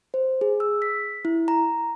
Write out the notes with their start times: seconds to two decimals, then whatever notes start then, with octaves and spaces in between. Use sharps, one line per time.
0.14 C5
0.41 G#4
0.60 E6
0.82 B6
1.25 E4
1.48 A#5